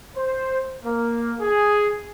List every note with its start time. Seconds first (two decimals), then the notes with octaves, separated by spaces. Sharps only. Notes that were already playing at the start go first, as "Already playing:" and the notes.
0.17 C5
0.83 A#3
1.41 G#4